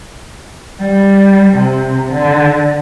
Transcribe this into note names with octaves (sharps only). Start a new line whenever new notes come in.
G3
C3
D3